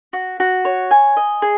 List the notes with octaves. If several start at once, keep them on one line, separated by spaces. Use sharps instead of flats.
F#4
F#4
C#5
G#5
D#5
G#4